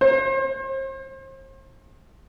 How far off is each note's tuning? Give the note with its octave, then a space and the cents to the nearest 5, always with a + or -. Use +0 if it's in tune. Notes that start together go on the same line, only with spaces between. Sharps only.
C5 +40